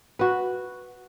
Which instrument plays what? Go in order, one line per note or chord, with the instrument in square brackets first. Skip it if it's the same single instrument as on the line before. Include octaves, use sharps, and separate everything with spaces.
[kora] F#4 B4